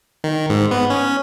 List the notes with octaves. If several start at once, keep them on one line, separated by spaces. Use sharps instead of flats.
D#3
G#2
B3
C#4